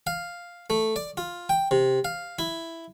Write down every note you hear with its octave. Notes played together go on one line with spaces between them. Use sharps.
F5
A3
D5
F4
G5
C3
F5
E4